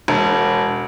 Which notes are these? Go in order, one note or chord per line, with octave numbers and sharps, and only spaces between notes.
E1